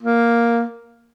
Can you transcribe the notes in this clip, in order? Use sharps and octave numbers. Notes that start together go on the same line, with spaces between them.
A#3